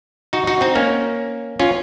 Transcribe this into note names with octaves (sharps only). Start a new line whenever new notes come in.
D#4 F#4
D#4 F#4
C4 D#4
A#3 C#4
C#4 F4